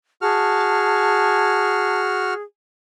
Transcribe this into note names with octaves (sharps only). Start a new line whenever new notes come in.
F#4 G#4 A5 F6